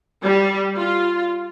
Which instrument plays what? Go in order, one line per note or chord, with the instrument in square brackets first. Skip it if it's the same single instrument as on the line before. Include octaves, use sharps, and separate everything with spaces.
[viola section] G3
F4